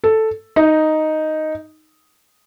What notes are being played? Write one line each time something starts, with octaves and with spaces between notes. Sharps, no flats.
A4
D#4